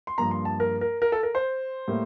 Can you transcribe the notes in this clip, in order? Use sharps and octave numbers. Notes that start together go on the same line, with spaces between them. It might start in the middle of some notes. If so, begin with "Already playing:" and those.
C6
G2 F3 A#3 A#5
C6
A5
A#4
A#4
A#4
A4
A#4
C5
A2 G3 A#3